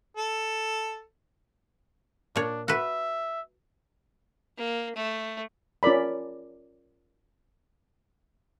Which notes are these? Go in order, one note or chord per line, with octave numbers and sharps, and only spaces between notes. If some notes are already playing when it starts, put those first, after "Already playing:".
A4
A#2 D4 C#5
F#4 B4 E5
A#3
A3
C#4 F4 A#4 D5 B5